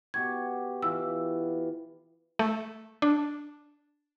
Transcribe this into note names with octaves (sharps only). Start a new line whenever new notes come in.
B2 G4 C#6 G#6
E3 F4 D6 E6
A3
D4